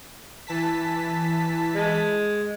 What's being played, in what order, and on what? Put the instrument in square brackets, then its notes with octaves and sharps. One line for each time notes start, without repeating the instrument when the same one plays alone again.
[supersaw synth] E3 A5 B6
[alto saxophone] G#3